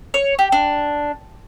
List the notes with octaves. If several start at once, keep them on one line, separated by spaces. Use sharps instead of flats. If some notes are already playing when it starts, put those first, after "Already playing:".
C#5
G4
D4